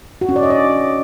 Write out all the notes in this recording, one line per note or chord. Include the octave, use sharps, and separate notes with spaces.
F#4
C#4
D5
D#5
D5